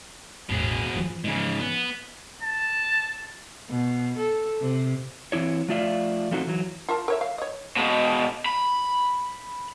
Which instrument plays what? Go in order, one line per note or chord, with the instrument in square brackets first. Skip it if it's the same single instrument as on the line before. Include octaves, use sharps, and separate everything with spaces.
[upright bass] A1 E2 [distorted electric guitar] B2 G#4
[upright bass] E3 F3
[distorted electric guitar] G#2 C#3
B3
[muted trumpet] A5
[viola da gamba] B2
A4
C3
[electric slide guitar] E3 C4 E4 C#5
F3 A3 F4 D5 E5 F5
F3 A3 C4 D#4 F#4 C5
E3 F#3
[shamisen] F4 A#4 A5
A#4 C#5 E5
F5
C#5 D#5
[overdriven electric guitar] B2 G#3
B5